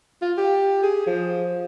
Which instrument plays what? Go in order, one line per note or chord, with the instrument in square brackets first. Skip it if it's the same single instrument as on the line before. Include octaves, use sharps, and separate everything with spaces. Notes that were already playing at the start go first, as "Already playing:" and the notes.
[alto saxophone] F4
G4
G#4
F3